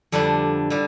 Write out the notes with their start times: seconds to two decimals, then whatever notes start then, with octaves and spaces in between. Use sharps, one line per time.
0.12 F2 D3 G3 D4
0.70 D3 G3